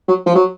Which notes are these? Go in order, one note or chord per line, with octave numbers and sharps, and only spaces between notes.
F#3
F3
F#3